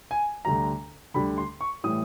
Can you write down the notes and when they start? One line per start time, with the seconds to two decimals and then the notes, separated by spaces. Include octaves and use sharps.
0.11 G#5
0.45 D2 D3 G3 A#5
1.14 D2 D3 G3 B5
1.38 C6
1.61 C#6
1.84 A2 E3 G3 D#6